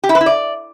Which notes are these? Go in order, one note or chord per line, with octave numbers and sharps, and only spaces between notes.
G4
E4
B4
E4
D5